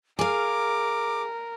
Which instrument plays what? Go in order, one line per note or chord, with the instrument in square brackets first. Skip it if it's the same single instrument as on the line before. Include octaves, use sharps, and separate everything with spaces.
[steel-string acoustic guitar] G#4 F5 [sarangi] A#4 [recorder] D6